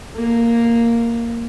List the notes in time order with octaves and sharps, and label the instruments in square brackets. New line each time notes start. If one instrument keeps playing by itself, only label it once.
[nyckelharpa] A#3